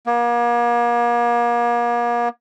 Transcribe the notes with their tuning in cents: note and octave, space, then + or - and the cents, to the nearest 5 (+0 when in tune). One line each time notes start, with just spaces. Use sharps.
A#3 +40